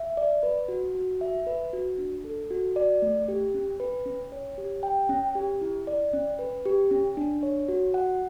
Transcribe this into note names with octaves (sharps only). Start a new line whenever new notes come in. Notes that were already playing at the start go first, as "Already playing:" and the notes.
Already playing: E5
D5
B4
F#4
F#4
E5
B4
F#4
D4
A4
F#4
D5
A3
G4
C#4
B4
C#4
C#5
G4
G5
C#4
G4
E4
D5
C#4
B4
G4
C#4
D4
C#5
F#4
F#5